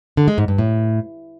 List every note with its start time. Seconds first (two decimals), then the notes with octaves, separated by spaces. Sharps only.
0.17 D3
0.28 G#3
0.38 G#2
0.48 G2
0.58 A2